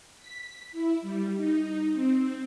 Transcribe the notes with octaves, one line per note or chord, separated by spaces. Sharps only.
B6
E4
G3
D#4
C4